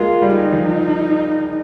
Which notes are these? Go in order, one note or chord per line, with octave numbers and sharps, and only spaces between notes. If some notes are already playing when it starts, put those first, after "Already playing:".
Already playing: G#3 A#3 F4
G3
D#4
F3